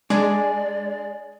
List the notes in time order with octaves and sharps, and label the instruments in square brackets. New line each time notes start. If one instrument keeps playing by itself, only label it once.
[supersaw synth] G#3 [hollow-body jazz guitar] D4 [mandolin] G#4 [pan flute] D5